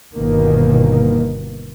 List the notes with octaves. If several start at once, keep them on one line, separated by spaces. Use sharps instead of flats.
G1 B2 D#3 A#3